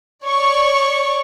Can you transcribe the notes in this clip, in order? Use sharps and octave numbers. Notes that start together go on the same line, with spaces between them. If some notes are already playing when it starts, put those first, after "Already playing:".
C#5 D5 C#6